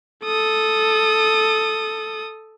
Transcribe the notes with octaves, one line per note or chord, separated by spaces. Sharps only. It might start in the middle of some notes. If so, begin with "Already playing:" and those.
A4 D#6